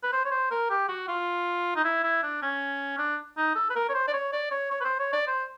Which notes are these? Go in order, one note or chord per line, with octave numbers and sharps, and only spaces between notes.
B4
C5
C#5
C5
A#4
G4
F#4
F4
D#4
E4
E4
D4
C#4
D4
D#4
A4
B4
A#4
C#5
C5
D5
C#5
D5
C#5
C#5
B4
C5
C#5
D5
C5